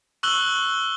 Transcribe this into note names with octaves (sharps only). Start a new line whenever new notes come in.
C#6 E6 F#6 F#7 G7